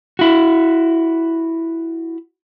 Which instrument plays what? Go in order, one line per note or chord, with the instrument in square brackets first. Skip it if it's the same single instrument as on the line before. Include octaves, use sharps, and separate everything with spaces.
[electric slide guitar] E4 F#4